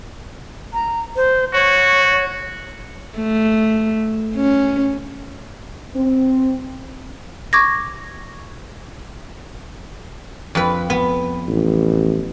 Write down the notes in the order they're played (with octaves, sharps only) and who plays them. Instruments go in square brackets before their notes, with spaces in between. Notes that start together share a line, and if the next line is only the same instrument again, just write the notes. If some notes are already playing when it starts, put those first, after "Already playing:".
[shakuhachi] A#5
C5
[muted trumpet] F#4 [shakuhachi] C#5
[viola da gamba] A3
C#4
[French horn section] C4
[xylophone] C#6 D6 G#6 A#6
[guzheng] F2 B4
B3
[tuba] A1